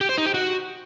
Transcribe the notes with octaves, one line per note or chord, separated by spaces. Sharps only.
G4
C5
D#4
G4
F#4